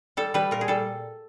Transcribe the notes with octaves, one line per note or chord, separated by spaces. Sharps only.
G3 A4
G3 B4
A#2 A#4
G#4
G3 A4